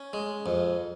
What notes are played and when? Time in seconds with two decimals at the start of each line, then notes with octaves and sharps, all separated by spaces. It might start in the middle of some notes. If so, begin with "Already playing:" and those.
Already playing: C#4
0.13 G#3
0.46 F2